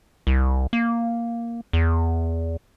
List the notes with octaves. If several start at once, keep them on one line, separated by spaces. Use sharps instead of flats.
C2
A#3
E2